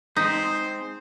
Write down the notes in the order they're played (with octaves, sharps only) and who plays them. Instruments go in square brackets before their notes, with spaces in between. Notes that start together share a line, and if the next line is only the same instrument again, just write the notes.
[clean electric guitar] G#3 C4 [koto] D#4 [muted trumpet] C5 [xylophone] D#6 G6 B6